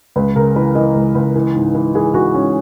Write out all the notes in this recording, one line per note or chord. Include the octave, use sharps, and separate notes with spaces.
C#2 B4
C#3 A#4
E3 B4
E3 D#5
C#2
C#2
E3
G#2
E3
E3 G#4
E3 F#4
G#2 C#4